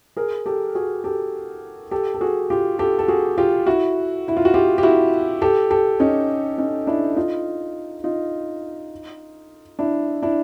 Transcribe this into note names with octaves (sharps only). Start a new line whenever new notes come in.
G#4 A#4
G4 A4
F#4 G#4
G4 A4
G4 A4
A4
F#4 G#4
F4 G4
G4 A4
A4
F#4 G#4
F4 G4
E4 F#4
E4
F4
F#4
F4 G4
G4
E4 F#4
G4 A4
G4 A4
C#4 D#4
C#4 D#4
D4 E4
D#4 F4
D#4 F4
D4 E4
D4 E4